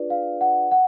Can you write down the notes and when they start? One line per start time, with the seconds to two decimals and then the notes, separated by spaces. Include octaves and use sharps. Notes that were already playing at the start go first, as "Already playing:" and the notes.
Already playing: D4 F4 G#4 B4 D5
0.10 F5
0.41 F#5
0.71 F#5